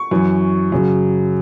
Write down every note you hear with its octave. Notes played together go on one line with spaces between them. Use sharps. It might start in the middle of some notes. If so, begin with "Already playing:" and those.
Already playing: C#6
F#2 E3
F#2 C#3 F#3